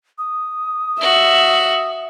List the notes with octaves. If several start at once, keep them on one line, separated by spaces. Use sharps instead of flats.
D#6
F#4 E5